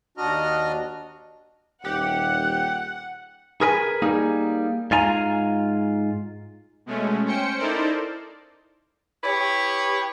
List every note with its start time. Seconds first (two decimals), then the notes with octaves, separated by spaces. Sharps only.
0.17 D#2 D4 F#4 D#5 A#5 F6
1.85 D#1 G4 F#5 F#6
3.61 G#4 A#4 B4 G#5
4.02 G3 A#3 D#4 G#4
4.91 G#2 F4 G#5 A#5
6.86 B2 G#3 A3 C#4
7.25 C#4 C5 G5 C#7
7.58 D#4 E4 A4 A#4 C5 D5
9.24 E4 G4 B4 C#5